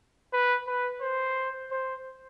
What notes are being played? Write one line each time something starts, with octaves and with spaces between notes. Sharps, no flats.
B4
B4
C5
C5